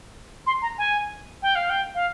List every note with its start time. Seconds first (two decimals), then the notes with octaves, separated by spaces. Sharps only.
0.47 C6
0.62 A#5
0.78 G#5
1.42 G5
1.55 F5
1.70 G5
1.95 F5